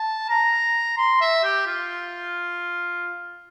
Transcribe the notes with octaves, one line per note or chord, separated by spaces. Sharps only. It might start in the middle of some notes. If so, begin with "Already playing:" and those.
Already playing: A5
A#5
C6
E5
G4
F4